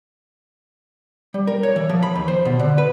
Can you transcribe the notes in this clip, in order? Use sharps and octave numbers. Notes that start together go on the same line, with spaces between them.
G3
A#4
C#5
E3
F3
B5
D#2
C5
B2
D3
B4